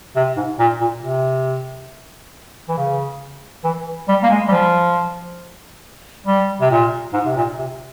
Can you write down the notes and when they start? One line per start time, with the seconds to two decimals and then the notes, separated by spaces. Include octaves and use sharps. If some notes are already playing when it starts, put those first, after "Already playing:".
0.16 C3
0.37 G#2
0.59 A#2
0.81 A#2
1.02 C3
2.69 E3
2.77 C#3
3.64 E3
4.08 G3
4.23 A#3
4.30 G#3
4.48 G3
4.51 F3
6.26 G3
6.61 C3
6.70 A#2
7.13 G#2
7.26 C3
7.36 A#2
7.58 C3